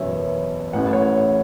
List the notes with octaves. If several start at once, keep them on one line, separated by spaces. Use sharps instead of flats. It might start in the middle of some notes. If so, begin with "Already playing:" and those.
Already playing: F#1 E2 B2 C#5 E5
A1 A2 E3 F#5
C#5